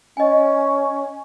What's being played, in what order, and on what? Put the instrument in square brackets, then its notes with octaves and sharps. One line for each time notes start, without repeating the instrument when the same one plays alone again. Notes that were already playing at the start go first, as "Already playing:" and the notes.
[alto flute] C#4 [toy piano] D#5 G#5